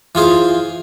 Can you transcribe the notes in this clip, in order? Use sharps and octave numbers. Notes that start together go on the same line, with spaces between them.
E3 F4 G#4 C5